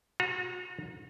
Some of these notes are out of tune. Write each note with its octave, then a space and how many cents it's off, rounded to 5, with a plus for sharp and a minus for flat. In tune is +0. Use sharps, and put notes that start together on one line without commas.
F#4 -35 A#5 +0